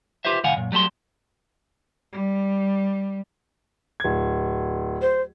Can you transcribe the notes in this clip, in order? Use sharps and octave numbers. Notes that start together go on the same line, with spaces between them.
F4 G4 B4 C5 E5
C2 A2 D#3 F5 F#5 G#5
F#2 A#2
F#3 G3 A3 A5 C6
G3
D1 G#6
C5